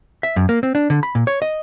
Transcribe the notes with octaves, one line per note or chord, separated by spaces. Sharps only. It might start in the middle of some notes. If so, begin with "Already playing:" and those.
E5
F#2
A#3
C4
D4
D3
B5
A#2
C#5
D#5